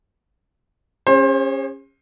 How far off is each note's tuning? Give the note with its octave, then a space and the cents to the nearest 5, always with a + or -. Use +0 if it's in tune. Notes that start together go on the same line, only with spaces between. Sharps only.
C#4 -15 G#4 -45 C5 +30